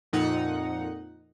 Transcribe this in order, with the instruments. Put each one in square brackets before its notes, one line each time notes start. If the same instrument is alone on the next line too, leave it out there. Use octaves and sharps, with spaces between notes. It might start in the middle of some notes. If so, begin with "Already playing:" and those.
[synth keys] F2 A#2 D#4 F#5